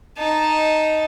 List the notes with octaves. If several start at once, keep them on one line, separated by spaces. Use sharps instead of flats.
D#4 A5